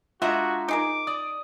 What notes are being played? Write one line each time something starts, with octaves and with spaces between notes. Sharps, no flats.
G#3 D4 F4 F#4 E5 F#5 A#5
D#4 G#4 A#4 D6
D5 D#6